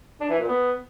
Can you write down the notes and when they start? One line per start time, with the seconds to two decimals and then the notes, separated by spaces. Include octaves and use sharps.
0.20 D4
0.29 E3
0.39 A#2
0.48 B3